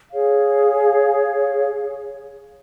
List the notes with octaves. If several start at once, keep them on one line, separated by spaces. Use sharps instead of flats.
G#4 C#5 F5